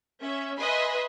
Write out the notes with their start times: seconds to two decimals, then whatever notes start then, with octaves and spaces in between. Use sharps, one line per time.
0.21 C#4 E5
0.58 B4 D#5 E5 G#5 B5 C6